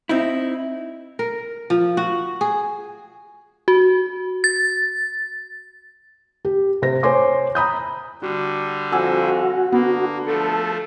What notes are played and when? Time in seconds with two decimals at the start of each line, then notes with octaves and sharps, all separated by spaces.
0.09 C4 D#4 E4
1.19 A#4
1.70 F3
1.97 F#4
2.41 G#4
3.68 F#4
4.44 A6
6.45 G4
6.82 C3 C5 A#6
7.03 C5 C#5 G#5 C6 D6
7.55 A#5 B5 D#6 G6
8.22 D3 G3 F#4
8.92 F2 F#4 F#5 G#5 E6
9.72 D3 A#3 B3
10.27 F3 A3 A4